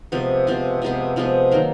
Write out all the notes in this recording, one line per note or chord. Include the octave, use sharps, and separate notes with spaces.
C3 F3 G#3 B3
C3 F3 G#3 B3
C3 F3 G#3 B3
C3 F3 G#3 B3
D#3 F#3 A#3